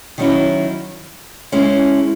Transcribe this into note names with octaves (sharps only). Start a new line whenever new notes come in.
D#3 F#3 C#4 E4
C#3 G#3 C#4 E4